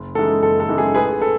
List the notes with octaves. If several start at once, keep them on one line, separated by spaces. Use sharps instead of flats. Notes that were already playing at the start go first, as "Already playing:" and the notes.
Already playing: F#1
F#2 E3 G#3 D#4 A4
F#1 A4
A4
F#2 E3 G#3 D#4
G#4
A1 G#4 B4
A4